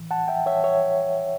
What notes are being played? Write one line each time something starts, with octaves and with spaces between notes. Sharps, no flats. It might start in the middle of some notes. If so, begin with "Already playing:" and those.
Already playing: A2 E3
F#5 A5
E5 G5
C#5 E5
C#5 E5